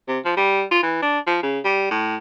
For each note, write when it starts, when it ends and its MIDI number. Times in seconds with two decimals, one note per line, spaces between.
0.08 0.19 48
0.25 0.34 53
0.37 0.63 55
0.71 0.81 65
0.83 1.00 52
1.02 1.19 62
1.27 1.38 53
1.43 1.60 49
1.65 1.90 55
1.91 2.16 45